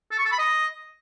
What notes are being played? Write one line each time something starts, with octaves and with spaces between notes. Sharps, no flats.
A4
C#6
A4
B5
D#5